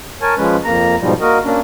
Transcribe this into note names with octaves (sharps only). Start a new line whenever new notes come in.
A#4 C#5 G#5 A5
F3 G#3 C#4 B4
F2 A#3 A#5
G#2 B2 F3 G3
A#3 F#4 A#4 D#5
A#3 C#4 D4